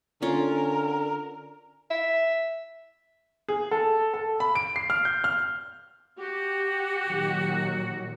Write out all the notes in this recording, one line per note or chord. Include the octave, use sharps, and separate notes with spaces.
D3 C#4 F4 A#4
E5
G#4
A4
A4
B5
D7
C7
F6
G6
F6
F#4 G4
A#2 D#3 F#3